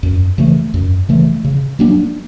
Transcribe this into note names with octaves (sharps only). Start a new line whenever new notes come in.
F#2
C#3 E3 A3
F#2
C#3 E3 A3
C#3
F#3 A#3 D4